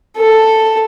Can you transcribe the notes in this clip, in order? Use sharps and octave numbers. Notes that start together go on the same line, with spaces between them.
A4